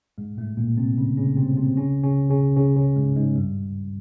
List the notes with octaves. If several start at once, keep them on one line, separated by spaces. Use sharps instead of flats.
G#2 G#3
A2 A3
A#2 A#3
C3 C4
C#3 C#4
C#3 C#4
C3 C4
C3 C4
C#3 C#4
C#3 C#4
C#3 C#4
C#3 C#4
C#3 C#4
G#2 G#3
G#2 G#3
G2 G3